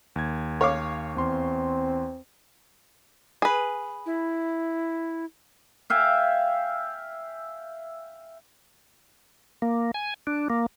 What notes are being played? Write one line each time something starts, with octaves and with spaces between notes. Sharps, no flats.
D#2 G#6
C#5 F5 D6
E2 C4 C6
G#4 B4
E4
E5 F5 G5 G#5
A#3
G#5
D4
A#3